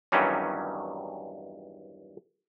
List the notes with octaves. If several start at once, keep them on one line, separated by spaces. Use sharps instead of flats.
E2 G2 D#3 F#3 G3 C#4